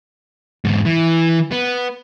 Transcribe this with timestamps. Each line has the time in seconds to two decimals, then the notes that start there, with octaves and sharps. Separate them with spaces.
0.65 E2 G#2
0.86 E3
1.51 B3